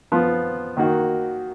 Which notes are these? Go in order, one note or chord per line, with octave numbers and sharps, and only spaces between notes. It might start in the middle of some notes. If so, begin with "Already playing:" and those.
F3 B3 F4
D#3 A#3 D#4 F#4